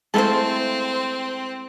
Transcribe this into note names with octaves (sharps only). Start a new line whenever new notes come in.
G#3 A3 C4 E4 C5 F5 A5